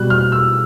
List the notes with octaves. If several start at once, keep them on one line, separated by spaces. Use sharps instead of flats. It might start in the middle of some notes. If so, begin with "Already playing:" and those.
Already playing: B2 G3 F#6
F6
E6